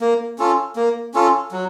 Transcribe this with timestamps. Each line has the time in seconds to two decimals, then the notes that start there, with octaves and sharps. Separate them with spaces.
0.01 A#3
0.39 C#4 F4 A4
0.76 A#3
1.14 C#4 F4 A4
1.52 F#3